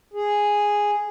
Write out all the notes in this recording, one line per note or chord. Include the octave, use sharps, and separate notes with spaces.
G#4